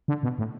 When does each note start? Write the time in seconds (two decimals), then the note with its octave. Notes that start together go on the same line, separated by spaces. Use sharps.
0.08 D3
0.23 B2
0.39 A2